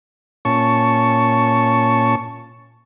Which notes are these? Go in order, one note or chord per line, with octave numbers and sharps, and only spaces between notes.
A#2 C#4 A5 C#6